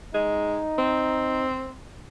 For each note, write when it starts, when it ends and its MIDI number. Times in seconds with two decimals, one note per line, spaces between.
0.15 0.60 56
0.15 1.46 63
0.78 1.75 60